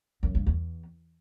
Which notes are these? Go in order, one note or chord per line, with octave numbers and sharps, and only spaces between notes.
F#2
G2
E2